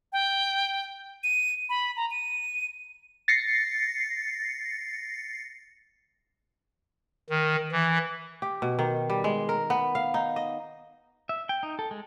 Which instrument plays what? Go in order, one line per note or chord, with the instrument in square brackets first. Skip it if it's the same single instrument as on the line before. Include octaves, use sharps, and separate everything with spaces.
[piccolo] G5
D#7
B5
A#5
D#7
[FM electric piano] A6 A#6 C7 C#7
[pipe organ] D#3
E3
[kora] G4
B2
D#3
G3
G#3
A#4
B3
F5
D#4
D#5
[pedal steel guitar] E5
G5
D#4
A4
G#3